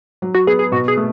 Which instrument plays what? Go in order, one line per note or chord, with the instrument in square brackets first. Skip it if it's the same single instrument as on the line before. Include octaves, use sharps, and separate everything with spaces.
[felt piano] F#3
[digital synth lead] F#4
[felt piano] B3 [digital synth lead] G#4
[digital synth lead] G#4
[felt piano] B2 [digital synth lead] F#4
[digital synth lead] G#4
[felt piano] A3